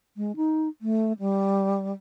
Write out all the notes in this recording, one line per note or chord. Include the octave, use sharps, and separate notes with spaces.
G#3
D#4
A3
G3